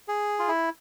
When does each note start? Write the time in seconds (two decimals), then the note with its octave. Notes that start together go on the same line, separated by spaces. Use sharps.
0.08 G#4
0.39 F4
0.48 E4